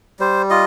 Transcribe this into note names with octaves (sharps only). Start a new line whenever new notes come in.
G3 C5
F4 D#5